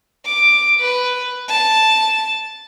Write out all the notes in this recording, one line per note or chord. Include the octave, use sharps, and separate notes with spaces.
D6
B4
A5